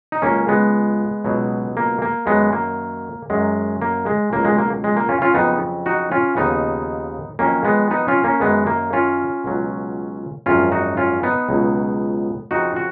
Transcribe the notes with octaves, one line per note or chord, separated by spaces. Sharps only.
D#4
C#2 C#3 F#3 A#3 C#4
G#3 B3
C#2 B2 F#3
A#3
A#3
F#2 D#3 F#3 G#3 B3
A#3
F#2 D#3 F#3 G#3
A#3
G#3
C#2 B2 F#3 A#3
G#3
A#3
G#3
A#3
C#4 F4
C#4 F4
F2 C#3 F#3 B3 D#4
D#4 F#4
C#4 F4
D#2 C#3 F3 B3 D#4
F2 D#3 F#3 A#3 C#4
G#3 B3
B3 D#4
C#4 F4
A#3 C#4
F#2 D#3 F#3 G#3 B3
A#3
C#4 F4
C#2 B2 F#3
G#1 F#2 F3 C#4 F4
D#4 F#4
C#4 F4
B3 D#4
C#2 B2 F#3
F2 C#3 F3 D#4 F#4
F#4